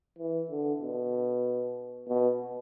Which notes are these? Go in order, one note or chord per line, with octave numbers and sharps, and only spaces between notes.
E3
D3
B2
B2